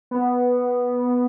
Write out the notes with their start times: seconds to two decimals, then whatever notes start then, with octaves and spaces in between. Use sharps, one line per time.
0.11 B3